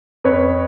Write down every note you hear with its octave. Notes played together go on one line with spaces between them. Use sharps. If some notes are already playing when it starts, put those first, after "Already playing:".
F2 B4 C#5